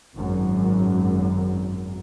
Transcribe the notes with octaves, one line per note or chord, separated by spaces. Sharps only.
G#1 F#2